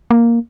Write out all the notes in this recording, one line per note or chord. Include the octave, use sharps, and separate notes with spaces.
A#3